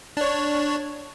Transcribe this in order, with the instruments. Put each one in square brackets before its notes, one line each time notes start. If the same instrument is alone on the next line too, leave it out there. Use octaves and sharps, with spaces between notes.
[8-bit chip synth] D4 C#5